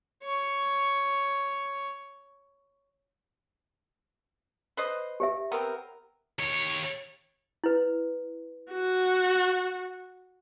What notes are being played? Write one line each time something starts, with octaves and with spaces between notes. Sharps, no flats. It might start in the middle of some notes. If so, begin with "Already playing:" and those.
C#5 C#6
B4 C5 D#5
G4 C#5 E5
B3 C4 A#4
D#2 C#5
E4 B4
F#4